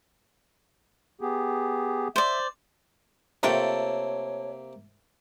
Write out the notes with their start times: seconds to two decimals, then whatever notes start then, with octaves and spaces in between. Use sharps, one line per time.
1.21 B3 G4 G#4
2.16 C5 D5 E5
3.43 C3 A3 A#3 F4 A4 C#5 G5